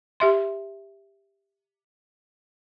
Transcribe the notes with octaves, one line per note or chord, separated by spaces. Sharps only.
G4 E5 C6